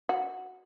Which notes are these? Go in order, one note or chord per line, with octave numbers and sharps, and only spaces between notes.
F#4